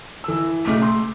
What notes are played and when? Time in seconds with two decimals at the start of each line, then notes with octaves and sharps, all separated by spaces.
0.24 E3 E6
0.65 B1 C#3 A3 D6
0.82 C6